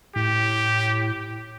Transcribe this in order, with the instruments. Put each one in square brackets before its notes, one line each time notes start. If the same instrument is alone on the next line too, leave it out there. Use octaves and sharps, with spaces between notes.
[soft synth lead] A2 [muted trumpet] G4